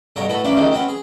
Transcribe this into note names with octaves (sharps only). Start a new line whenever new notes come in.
B1 G2 G3 C#5 A#5 C#6
A2 F#4 A4 B4
A#3 C#4 D4 E4 B4
A#1 F#2 A#2 D#3 G#3 A3
C4 C#4 F#4 B4
G#4